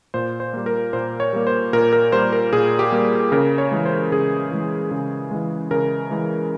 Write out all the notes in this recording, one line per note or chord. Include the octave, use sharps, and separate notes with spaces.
A#2 C5
C5
G3 A#3
A#4
A#2 C5
C#5
G3 A#3
C5
A#2 A#4
A#4
G3 A#3 C5
A#4
A#2 G#4
G4
G3 A#3
C#3 A#4
C#5
E3 G#3
C5
C#3 G#4
E3 G#3
C#3
E3 G#3
C#3 A#4
E3 G#3